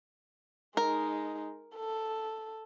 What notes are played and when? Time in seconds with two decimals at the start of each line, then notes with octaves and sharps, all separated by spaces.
0.77 G#3 D#4 A#4
1.76 A4